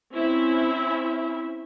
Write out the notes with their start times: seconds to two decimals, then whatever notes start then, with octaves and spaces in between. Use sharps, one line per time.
0.12 C4 C#4 E4 E5